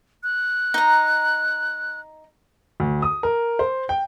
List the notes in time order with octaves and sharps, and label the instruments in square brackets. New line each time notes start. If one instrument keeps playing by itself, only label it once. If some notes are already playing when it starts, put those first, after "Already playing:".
[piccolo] F#6
[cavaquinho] D#4 A#5
[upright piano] D2
D#6
A#4
C5
G5